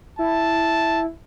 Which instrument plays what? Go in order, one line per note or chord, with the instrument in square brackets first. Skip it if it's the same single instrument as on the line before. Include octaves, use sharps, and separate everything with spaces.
[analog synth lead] E4 [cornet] A5